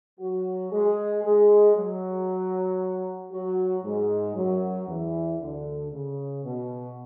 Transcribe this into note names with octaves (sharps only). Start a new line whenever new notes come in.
F#3 F#4
G#3 G#4
G#3 G#4
F#3 F#4
F#3 F#4
G#2 G#3
F#2 F#3
E2 E3
D2 D3
C#3
B2